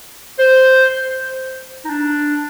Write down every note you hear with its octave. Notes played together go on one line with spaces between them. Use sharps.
C5
D#4
D4